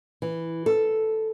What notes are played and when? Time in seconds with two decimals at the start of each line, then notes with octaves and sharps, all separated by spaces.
0.22 E3
0.66 A4